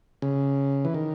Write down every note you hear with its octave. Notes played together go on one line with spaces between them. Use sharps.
C#3
E3
D#3